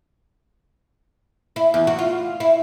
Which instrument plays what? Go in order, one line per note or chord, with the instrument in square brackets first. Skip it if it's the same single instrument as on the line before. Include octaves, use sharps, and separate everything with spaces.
[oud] E4
E2
F#4
F4
E4